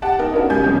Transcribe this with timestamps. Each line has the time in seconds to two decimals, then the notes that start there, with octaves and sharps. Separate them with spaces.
0.02 G4 F#5 A5
0.19 D#4 A#4
0.33 B3 C#4 D4 F#4 A#4
0.50 C#3 G3 G#5 G6
0.64 F2 C3 C#4